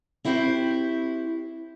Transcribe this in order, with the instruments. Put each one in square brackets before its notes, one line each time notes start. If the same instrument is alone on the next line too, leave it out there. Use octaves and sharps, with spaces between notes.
[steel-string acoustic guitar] C4 E4 F#4 G4 C5